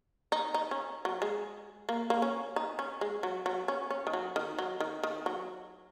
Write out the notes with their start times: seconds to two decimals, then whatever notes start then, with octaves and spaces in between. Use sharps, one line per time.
0.32 D#4
0.54 D#4
0.71 C#4
1.05 F#3
1.22 G#3
1.89 A#3
2.10 A#3
2.22 C#4
2.56 D#4
2.79 C#4
3.01 G#3
3.23 F#3
3.46 F#3
3.68 C#4
3.90 C#4
4.07 D#3
4.13 F#3
4.36 D#3
4.58 F#3
4.80 D#3
5.03 D#3
5.26 F#3